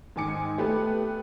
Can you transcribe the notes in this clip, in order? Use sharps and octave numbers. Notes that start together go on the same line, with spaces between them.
G#2 D#3 G#5 D6 C#7
A3 B3 G4 B4